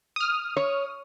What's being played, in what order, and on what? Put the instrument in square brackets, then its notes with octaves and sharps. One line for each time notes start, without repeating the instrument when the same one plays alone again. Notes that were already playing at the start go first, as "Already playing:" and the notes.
[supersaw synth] D#6 F6
[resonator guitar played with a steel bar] C#5